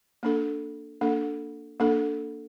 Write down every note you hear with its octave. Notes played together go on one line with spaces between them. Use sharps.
A#3 D4 A4
A#3 D4 A4
A#3 D4 A4